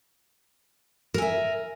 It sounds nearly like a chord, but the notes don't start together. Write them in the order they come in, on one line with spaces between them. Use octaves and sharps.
A#4 G#5 E5